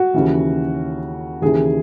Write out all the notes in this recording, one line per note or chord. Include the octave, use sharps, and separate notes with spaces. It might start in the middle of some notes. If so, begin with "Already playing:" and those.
Already playing: F#4
D#2 C#3 E3
D#2 C#3 E3 G#4